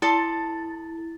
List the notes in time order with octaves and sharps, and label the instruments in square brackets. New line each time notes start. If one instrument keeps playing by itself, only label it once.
[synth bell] E4 A6 [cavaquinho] A4 A5 C6